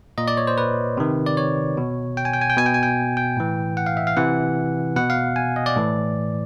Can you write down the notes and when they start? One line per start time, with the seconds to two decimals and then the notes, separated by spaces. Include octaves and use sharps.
0.18 A#2 D#5
0.28 D5
0.37 C#5
0.47 C5
0.58 B4
0.97 C3 D#3
1.26 D5
1.37 C#5
1.77 B2
2.17 G5
2.25 G#5
2.33 G5
2.41 G#5
2.50 G5
2.57 B2 G#5
2.66 G5
2.74 G#5
2.83 G5
3.17 G5
3.37 A2 E3
3.77 F#5
3.86 F5
3.97 E5
4.07 F5
4.17 C3 E3 F#5
4.96 B2 F#5
5.10 F5
5.36 G#5
5.56 D#5
5.66 D5
5.76 A2 E3